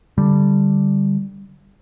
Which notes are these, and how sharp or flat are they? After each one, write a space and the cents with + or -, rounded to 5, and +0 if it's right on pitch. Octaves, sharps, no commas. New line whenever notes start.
D3 +0 G3 +0